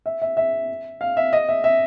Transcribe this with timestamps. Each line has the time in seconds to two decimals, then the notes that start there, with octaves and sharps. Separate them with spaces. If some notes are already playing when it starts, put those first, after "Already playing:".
0.06 E5
0.22 E5
0.37 E5
1.01 F5
1.17 E5
1.33 D#5
1.49 E5
1.64 E5